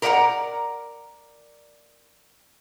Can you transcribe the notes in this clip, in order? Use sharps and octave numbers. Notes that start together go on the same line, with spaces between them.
A#4 B4 D5 E5 F#5 A#5